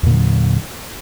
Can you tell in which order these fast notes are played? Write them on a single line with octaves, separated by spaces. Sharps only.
E2 A#2 D3 F#3